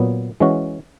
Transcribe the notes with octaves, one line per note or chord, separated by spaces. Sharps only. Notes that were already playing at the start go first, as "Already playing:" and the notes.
Already playing: A#2 F#3 B3
E3 G#3 C#4 F#4